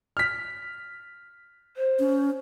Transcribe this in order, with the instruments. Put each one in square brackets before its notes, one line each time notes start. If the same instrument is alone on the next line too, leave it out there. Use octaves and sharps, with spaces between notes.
[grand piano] F6 B6
[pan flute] C5
[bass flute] C#4